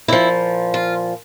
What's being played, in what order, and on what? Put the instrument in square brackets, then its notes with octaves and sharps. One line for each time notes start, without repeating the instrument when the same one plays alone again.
[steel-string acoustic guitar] A#2 F3 E4
F4